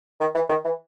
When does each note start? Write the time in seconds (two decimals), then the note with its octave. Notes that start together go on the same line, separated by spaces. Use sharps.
0.20 D#3
0.35 E3
0.49 D#3
0.65 E3